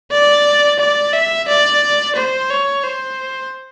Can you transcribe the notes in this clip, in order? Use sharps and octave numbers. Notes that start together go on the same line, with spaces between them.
D5
D5
E5
D5
C5
C#5
C5